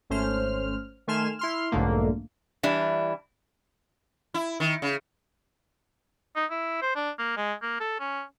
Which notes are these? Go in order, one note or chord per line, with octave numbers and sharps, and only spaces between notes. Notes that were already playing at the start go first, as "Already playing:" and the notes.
G#1 A3 C#4 C5 F6
D#3 A3 G#5 C6 F6 E7
E4 C6 F6
B1 F2 G#2 D3 A3 A#3
E3 G3 D4 E4
E4
D#3
C#3
D#4
E4
C5
D4
A#3
G#3
A#3
A4
C#4